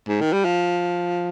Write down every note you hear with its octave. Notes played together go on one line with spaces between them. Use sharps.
G#2
D#3
G3
F3